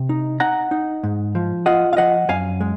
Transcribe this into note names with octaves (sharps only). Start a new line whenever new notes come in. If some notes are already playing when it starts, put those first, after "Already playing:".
Already playing: C3
D#4
D#4 F#5 A#5
D#4
G#2
F3
F4 D#5 F#5
F5
F3 D#5 F#5
F#2 F5 G#5
G#3